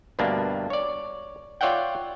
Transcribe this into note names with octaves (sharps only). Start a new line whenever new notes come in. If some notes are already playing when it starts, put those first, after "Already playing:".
D2 G2 B2 A#3 D4
C#5 D5
F4 C#5 D5 E5 F#5 G5